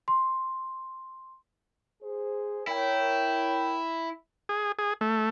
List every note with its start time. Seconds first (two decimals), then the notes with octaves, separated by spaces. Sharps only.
0.08 C6
2.02 G#4 C5
2.67 E4 A#4 C#5 G5
4.49 G#4
4.79 G#4
5.01 A3